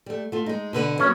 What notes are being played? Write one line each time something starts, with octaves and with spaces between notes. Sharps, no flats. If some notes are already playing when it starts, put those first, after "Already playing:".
G3 A3
A3 F4
G#3 D#4
B2 D3 B4
F#3 G3 A#3 C#4